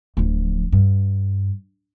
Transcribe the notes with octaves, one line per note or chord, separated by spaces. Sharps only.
D1 F3
G2